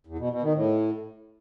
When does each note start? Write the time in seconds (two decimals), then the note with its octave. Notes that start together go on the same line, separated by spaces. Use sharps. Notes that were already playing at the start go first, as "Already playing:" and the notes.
0.07 E2
0.19 B2
0.30 B2
0.42 D#3
0.54 A2